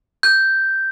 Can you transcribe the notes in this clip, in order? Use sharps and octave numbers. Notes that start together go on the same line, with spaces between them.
G6